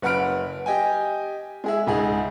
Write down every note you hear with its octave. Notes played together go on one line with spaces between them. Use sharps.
F#1 B4 F#5 B5 F6 D7
G4 D#5 G5 G#5
G#3 G#4 E5
C#2 G#2 G#4 D#5